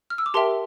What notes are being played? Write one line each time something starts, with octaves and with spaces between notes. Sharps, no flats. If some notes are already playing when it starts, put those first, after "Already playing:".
F6
E6
D6
G4 A#4 E5 G5 A5 C6